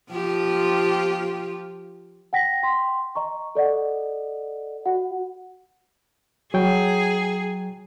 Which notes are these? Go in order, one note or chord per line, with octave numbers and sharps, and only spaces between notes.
F3 F4 G4
F#5 G5 A#6 B6
G5 C6
D#5 A#5 C#6
A4 D5 D#5 F#5
F#4 F#5
F#3 G#4 G5